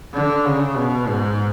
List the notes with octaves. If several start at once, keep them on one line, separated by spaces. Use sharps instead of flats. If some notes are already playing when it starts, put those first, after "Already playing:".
D3
C#3
B2
G#2